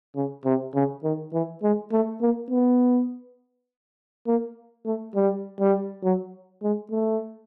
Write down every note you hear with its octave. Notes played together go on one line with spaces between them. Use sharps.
C#3
C3
C#3
D#3
E3
G#3
A3
A#3
B3
A#3
A3
G3
G3
F#3
G#3
A3